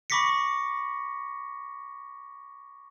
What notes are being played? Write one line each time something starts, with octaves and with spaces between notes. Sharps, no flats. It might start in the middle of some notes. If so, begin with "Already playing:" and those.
B5 C#6 D6 A#6 B6 C#7